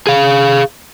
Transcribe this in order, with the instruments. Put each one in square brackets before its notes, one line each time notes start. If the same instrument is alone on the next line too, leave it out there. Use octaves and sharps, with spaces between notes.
[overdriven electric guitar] G#4 F5